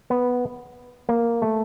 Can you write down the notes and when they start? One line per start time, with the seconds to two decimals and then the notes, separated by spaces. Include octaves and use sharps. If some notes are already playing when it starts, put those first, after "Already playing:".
0.10 B3
1.09 A#3
1.42 A3